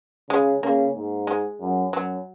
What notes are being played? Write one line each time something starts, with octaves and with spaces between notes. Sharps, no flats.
C#3 G#3
C#3 A#3
G#2
G#3
F#2
F#2 F#3